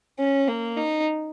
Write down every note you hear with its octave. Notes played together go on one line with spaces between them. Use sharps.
C#4
A#3
D#4